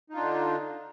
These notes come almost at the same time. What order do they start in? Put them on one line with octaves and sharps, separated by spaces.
D#4 F4 D4 D3